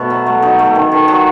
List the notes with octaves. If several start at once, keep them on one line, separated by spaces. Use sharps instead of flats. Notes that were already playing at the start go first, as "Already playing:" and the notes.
Already playing: B2 A3 A4
F#3
A3
F#3 D#4
A3
D#3
D#3
F#3